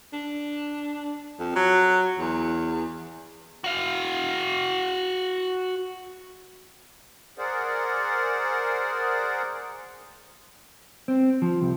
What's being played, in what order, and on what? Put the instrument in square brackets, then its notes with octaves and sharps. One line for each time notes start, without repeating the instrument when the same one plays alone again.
[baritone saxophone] D4
F2
F#3
E2
[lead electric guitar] F#4 F5
[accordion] G#4 A#4 C5 D5 F#5
[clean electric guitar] C4
F3
C2